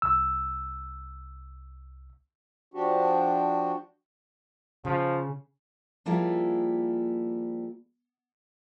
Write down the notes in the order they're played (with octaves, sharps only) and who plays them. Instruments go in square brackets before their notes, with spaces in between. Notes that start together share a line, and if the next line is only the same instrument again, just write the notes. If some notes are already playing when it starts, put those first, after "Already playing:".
[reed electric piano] C2 E6
[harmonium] F3 D4 F#4 G4
[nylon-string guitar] C#3 [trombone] F3
[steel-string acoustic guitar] F3 G3 A#3 E4 F4 G#4